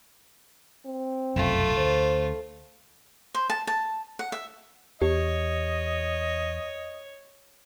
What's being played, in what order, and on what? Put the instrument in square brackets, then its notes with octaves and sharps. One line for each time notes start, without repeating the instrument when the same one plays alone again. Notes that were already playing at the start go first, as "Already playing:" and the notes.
[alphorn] C4
[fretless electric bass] F1 B1 F#2 [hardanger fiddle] A3 F4
[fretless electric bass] D2 [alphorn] C5
[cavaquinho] C5
A5
A5
F#5
E5
[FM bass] E2 [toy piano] G4 [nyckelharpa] C#5 [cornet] D#5